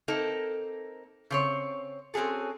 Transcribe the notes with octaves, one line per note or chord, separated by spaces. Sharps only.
A#3 C4 D#4 A4 A#4
C#3 C4 C#5
C4 C#4 F#4 G#4 A4